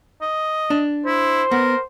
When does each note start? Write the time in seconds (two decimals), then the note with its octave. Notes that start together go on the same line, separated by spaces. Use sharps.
0.22 D#5
0.70 D4
1.06 E4 C5
1.51 B3 A#4